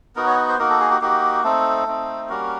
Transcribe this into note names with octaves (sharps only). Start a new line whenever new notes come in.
B3 D#4 F#4 A#4
C#5
C5
A#3 D#4 F#4 A#4
A4
G#4
G4
A#3 D#4 F#4 G4
A3 C4 D#4 A4
A3 C4 D#4
G3 A#3 C#4 F#4 A#4